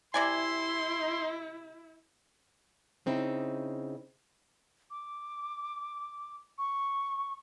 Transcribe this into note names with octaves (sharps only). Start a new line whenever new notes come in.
C3 E4 D5 G#5 C6
C#3 C4 D#4 E4
D6
C#6